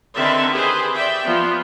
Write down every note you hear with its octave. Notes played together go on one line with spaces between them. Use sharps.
D3 D#3 C4 A4 B4 E5
G4 G#4 B4 C5
D5 E5 G5
F3 B3